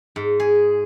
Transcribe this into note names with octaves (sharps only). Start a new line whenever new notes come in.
G#2
G#4